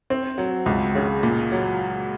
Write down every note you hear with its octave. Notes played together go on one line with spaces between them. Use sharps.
C4
F#3
C#2
C#3
A#2
F#3